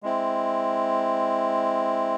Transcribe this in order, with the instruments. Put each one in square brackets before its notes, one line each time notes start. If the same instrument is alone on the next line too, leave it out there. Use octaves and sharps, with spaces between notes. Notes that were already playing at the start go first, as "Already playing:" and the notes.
[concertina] G#3 C4 E4